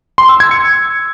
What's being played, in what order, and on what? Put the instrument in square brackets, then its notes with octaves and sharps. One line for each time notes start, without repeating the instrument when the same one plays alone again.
[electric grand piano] C6
E6
G#6
C#7